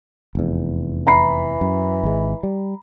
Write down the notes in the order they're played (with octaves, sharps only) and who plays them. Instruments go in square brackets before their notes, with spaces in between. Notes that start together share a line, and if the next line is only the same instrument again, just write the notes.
[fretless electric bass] F1 E2
[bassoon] E3 [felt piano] A#5 B5 C7
[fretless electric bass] F#2
G#1 G#3
G3